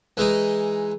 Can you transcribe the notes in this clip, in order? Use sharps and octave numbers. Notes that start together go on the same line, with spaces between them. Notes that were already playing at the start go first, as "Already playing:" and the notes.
E3 G#3 D#4